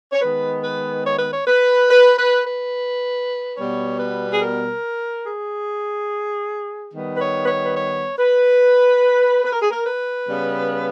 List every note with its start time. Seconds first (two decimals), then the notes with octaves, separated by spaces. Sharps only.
0.13 C#5
0.22 D#3 G#3 B3 B4
0.63 B4
1.06 C#5
1.19 B4
1.33 C#5
1.47 B4
1.90 B4
2.17 B4
2.46 B4
3.57 B2 G3 B3 C#5
4.00 B4
4.32 G#4
4.42 A#4
5.24 G#4
6.93 D#3 G3 B3
7.15 B4
7.21 C#5
7.44 B4
7.48 C#5
7.66 B4
7.77 C#5
8.19 B4
9.44 B4
9.52 A#4
9.61 G#4
9.71 A#4
9.86 B4
10.27 C#3 G3 B3